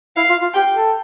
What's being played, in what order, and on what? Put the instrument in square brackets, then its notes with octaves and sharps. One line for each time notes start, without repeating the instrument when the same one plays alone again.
[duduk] E4 [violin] F5
[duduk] F4
F4
[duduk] G4 [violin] G5
[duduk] A4